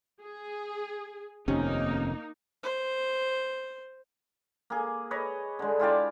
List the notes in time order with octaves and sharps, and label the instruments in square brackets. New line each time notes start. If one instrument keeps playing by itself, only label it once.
[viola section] G#4
[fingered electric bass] F1 D#2 C3 [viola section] A#3 D#4 [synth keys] C#4
[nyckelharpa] C5
[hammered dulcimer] A#3 G#4
B4 C#5 D#5
D3 G#3
E4 F4 G4 D5